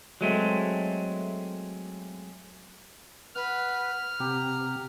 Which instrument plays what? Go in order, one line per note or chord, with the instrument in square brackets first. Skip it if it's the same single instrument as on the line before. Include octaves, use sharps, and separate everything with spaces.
[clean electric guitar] F#3 G#3 A3 C4
[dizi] B4 [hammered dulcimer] F#5 [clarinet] F6
[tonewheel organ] C3 [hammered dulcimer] G4 [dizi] A#5